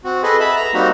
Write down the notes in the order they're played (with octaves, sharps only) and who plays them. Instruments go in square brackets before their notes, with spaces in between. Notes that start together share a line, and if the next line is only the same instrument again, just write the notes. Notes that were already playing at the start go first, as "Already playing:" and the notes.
[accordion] C4 F#4
G#4 A4 B4 D#5
E5 A5 B5
A#5
G3 A#3 C4 D#4 F#4